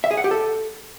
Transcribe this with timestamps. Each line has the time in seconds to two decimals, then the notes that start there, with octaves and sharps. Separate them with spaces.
0.04 E5
0.11 G#4
0.17 F#5
0.24 G4
0.31 A4